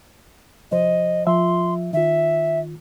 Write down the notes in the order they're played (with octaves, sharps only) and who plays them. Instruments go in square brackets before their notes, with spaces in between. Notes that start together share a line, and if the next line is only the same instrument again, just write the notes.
[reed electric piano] C2 F3 C5 [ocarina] D#5
[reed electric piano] F3 F4 E5 [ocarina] C6
[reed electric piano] D#3 F4 [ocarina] E5